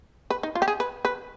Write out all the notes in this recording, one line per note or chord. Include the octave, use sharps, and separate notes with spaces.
B4
D#4
F4
G4
G#4
B4
B4